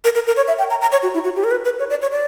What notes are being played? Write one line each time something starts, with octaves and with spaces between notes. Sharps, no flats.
A#4
A#4
A#4
C#5
E5
G5
A#5
A#5
C#5
F#4
E4
F#4
G4
A#4
B4
B4
C#5
D5
C#5
D5